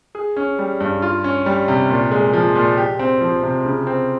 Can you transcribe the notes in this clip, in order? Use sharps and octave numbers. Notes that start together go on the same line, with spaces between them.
G#4
C#4
G3
G2
F4
C#4
G3
C3
A#2
G#3
F3
A#2
G4
C4
F3
C3
C#3
C4